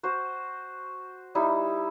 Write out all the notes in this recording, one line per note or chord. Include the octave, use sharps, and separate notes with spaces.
F#4 C5
G3 D#4 E4